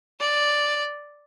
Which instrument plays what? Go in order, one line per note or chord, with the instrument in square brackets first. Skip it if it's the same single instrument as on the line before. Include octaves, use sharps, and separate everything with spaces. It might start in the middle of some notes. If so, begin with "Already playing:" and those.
[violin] D5